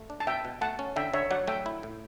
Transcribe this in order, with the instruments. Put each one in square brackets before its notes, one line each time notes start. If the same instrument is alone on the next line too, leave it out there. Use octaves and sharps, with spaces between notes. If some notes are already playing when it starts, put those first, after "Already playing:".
Already playing: [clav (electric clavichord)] A3
D4
[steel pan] A5
[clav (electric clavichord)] B2 [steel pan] E5 G5
[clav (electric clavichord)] B2
[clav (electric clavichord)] A3 [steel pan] F#5 A5
[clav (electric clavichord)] C#4
[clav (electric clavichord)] D3 [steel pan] E5 G5
[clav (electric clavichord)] D3 [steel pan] C#5 E5
[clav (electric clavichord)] F#3 [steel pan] D5 F#5
[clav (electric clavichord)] A3 [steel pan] E5 G5
[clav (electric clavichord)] E4
A2